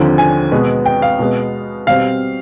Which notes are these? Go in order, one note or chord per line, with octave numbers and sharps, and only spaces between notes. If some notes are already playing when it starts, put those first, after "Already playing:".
Already playing: D#2 D3 F3 C4
G#5
B2 G#3 B3
G5
F5
B2 G#3 B3
B2 G3 C4 F5